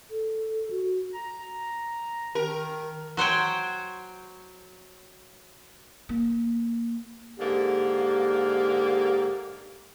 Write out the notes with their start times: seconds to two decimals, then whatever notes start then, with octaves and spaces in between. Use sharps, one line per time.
0.10 A4
0.70 F#4
1.14 A#5
2.35 D#3 A#4
3.17 F#3 C5 C#5 G5
6.09 A#3
7.39 G#2 D3 A#3 G4